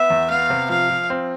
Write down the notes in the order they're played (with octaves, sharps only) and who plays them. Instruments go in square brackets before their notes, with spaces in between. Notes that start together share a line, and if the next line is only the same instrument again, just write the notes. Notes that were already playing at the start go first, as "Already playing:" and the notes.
Already playing: [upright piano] B3 [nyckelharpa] E5
[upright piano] E2
[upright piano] B3 [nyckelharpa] F5
[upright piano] C3
[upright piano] F3 [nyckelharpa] F5
[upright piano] F3
C4